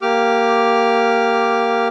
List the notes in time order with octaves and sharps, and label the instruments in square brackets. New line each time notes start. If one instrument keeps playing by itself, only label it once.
[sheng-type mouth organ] A#3 G4 D6 F6